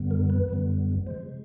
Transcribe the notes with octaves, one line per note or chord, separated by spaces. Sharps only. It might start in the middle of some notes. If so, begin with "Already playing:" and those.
Already playing: F#2 D3 G3 B3
A#4
B4
F#2 D3 G3 B3
C3 F3 G#3 C5